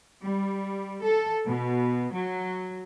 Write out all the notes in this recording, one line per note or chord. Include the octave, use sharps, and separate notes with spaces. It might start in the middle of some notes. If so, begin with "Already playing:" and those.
G3
A4
B2
F#3